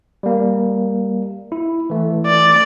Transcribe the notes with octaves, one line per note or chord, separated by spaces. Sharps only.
G3 A#3
E4
E3 A3
D5